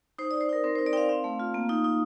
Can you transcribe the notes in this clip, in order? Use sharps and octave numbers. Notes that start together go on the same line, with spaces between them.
D#4 C5
D#4 D5
C5
D#4 A#4
C4 A#4
D#4 C5
D5
C4 F5 G5
C4
A3
F4
A#3
D#4
D#4